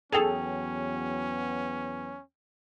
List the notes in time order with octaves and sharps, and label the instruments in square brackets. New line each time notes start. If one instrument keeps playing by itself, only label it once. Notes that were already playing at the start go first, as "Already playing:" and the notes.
[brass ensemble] E2 F#3 B3 [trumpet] C#4 [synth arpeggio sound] G#4 A4 [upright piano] G5 F7